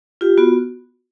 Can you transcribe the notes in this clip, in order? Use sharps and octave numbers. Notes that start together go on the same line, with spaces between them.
F4 G4
B3 F#4